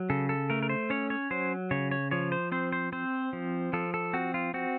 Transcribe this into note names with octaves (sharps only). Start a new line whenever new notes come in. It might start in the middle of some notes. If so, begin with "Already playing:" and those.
Already playing: F#3
C#3 A4
A4
A3 A#4
A#4
C5
C#4 C#5
C#5
F#3 C5
C#3 C#5
C#5
F3 C#5
C5
C4 C5
C5
C4 C5
F3
F3 A4
A4
C4 F#4
F4
C4 F#4